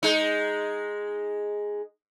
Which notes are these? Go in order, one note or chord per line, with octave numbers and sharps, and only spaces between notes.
G#3 D#4